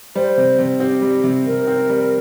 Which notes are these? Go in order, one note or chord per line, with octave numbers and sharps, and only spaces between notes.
G3 C5
C3
C3
C4 G4
G3
C3
C3 A#4
C4
G3